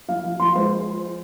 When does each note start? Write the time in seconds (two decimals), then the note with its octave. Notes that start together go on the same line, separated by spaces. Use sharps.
0.08 F3 F5
0.24 F3
0.39 F3 C6
0.55 G#3 C5